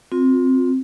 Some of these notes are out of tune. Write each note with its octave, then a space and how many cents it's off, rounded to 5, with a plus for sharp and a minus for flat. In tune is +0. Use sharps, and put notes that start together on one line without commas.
C4 +0 F4 +35